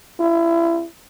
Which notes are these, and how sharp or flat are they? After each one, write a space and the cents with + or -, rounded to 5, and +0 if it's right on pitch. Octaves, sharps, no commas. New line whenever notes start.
E4 +30